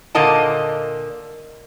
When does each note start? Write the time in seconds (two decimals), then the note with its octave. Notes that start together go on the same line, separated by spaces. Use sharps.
0.15 A#2 D3 A#3 A#4 D#5 A5